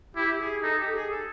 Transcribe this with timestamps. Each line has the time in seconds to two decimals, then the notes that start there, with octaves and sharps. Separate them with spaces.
0.16 E4 G4
0.40 G#4
0.63 D#4 A4
0.78 G4
0.94 G#4
1.10 A4